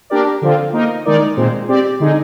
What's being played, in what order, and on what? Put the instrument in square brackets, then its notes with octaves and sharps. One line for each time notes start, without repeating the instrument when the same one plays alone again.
[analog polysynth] A#3 D4 G4 A#4 D5
D3 F3 C4 F4
A#3 D#4 A#4 D#5
D#3 G#3 D#4 A#4 D5
A#2 G#3 C4
C4 G4 D5
D3 G#3 D#4 G#4